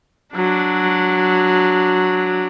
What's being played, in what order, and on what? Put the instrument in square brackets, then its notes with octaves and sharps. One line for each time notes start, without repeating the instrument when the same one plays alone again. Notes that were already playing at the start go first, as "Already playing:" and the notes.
[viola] F#3 D4